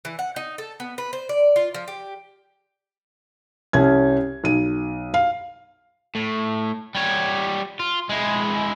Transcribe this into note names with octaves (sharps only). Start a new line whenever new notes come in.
E3
F#5
D#4
A4
B3
B4
C5
D5
F4
F3
G4
C2 C#4 G#6
B1 D#7
F5
A2
G3 C#5
F4
G#3 E4